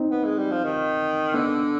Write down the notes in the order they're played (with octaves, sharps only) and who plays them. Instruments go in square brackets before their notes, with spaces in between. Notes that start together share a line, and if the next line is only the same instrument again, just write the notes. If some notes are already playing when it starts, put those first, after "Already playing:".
Already playing: [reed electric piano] C4 D#4
[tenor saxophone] B3
G#3
G3
F3
D#3
[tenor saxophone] D3 [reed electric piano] B3 D4